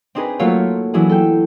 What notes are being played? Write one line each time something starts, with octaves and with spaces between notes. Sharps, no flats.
C4 D4 D#4 G#4 B4
F#3 A3 A#3 F4 F#4 C#5
E3 F#3 D4 E4 G#4
A4 G5